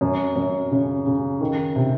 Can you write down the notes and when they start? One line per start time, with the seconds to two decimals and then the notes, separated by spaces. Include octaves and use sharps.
0.01 F#2
0.36 F#2
0.71 C#3
1.06 C#3
1.41 D#3
1.76 C3